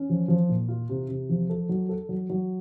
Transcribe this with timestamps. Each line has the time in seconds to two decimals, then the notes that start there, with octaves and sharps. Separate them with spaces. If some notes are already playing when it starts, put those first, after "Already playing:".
Already playing: C#4
0.09 F3
0.28 F3
0.49 A#2
0.68 F4
0.89 C3
1.09 C3
1.29 F3
1.50 A4
1.69 F#3
1.89 A4
2.09 F#3
2.30 F#3